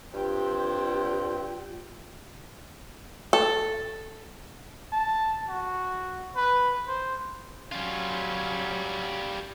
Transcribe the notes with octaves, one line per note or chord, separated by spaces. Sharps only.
G2 C4 F4 G4 G5
A4
A5
F#4
B4
C5
F#3 G3 C#4 F4